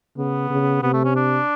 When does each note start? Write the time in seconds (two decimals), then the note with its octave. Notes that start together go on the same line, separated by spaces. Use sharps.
0.17 C#3 B3
0.50 C#3
0.82 C3 B3
0.93 A3
1.04 C#4
1.16 D4